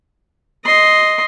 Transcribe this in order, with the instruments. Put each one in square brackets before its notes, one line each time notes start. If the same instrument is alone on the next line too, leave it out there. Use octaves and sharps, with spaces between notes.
[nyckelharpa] D#5 C6